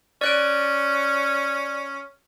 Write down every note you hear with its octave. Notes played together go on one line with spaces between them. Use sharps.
C#4 D5 F#6 D7